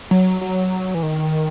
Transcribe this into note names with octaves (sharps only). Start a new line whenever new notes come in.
F#3
F#3
E3
D#3